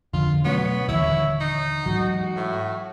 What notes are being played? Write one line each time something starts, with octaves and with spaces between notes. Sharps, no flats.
F2 D3 F4
B2 F#3 A3 B3 C#4 C#5
D#1 D3 E3 E4
D#4
G#2 E3 F#3 F#4
A2